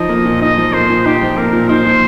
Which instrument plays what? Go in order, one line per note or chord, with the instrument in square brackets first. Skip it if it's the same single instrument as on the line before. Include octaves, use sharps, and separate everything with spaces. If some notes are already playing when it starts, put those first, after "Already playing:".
Already playing: [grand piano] F3 D#4 [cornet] D#5
[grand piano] A#3
A#2
[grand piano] D#4 [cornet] D#5
[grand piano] F3
[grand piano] A#3 [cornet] C5
[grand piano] A#2
[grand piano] D#4 [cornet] G4
[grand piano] F3
[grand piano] A#3 [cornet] A#4
[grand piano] A#2
[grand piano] D#4 [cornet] C5
[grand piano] F3